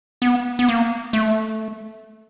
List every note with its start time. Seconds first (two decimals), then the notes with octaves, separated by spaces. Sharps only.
0.22 B3
0.59 B3
0.69 A#3
1.13 A3